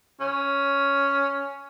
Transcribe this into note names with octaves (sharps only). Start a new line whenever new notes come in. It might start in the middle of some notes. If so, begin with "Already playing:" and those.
C#4